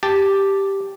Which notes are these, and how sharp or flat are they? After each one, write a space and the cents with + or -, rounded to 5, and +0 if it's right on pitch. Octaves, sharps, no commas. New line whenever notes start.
G4 +0 A5 +0